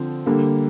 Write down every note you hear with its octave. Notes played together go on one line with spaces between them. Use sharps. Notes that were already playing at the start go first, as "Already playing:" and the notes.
Already playing: D3 F3 C4
D3 G3 A#3